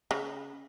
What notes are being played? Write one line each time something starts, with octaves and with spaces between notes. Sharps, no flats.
C#3